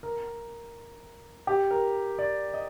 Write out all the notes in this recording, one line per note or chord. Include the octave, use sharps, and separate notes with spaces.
A#4
G4
A#4
D5
D#5